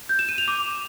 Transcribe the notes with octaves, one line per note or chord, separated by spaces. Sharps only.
G6
E7
D#7
F7
D6